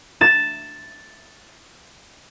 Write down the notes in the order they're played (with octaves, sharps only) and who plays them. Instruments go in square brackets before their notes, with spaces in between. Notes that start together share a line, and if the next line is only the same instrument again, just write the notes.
[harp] A6 E7